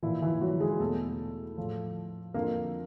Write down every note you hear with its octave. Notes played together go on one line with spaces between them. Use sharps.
A#2 E3 F3 E4
E3 E4
F#3 F#4
G#3 G#4
E2 B2 A3 A4
A2 F3
F2 D3 F3 A#3 A#4